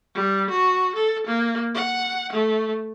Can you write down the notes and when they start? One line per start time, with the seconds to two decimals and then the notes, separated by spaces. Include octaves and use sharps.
0.15 G3
0.50 F#4
0.95 A4
1.27 A#3
1.74 F#5
2.33 A3